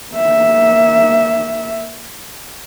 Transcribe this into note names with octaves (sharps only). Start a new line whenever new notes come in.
A#3 E5